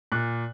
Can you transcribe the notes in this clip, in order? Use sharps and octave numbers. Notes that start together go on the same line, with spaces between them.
A#2 F#6